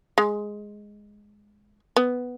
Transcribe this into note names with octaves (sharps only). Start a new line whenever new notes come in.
G#3
B3